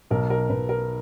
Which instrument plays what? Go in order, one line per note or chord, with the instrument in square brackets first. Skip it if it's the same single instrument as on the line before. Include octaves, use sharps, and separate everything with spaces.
[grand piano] B1 [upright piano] A#4
[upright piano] A#4
[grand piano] B1 [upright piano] B4
[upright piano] A#4